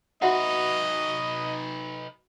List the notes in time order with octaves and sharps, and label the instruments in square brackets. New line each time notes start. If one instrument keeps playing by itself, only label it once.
[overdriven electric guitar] D#4 B4 [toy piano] F#4 E5 F#5 [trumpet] D#5